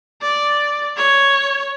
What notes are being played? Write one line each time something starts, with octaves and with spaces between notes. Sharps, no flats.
D5
C#5